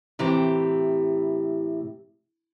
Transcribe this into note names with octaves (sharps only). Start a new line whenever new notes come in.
A2 C3 E3 G4 A#5